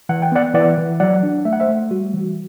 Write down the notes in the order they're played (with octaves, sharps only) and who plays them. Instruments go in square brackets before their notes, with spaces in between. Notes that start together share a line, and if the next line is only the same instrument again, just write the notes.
[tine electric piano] E3 F#5
G5
B3 D5 F#5
E3 D5 F#5
E3
F#3 D5 F#5
D4
A3 E5
F#5
C5 E5
A3
G3 F#4
E3